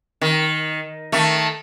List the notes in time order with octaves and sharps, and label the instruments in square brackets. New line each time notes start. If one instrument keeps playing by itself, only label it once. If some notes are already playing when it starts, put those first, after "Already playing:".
[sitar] D#3
D#3 A3